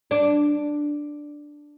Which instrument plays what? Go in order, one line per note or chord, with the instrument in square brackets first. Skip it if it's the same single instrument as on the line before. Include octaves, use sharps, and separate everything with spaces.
[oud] D4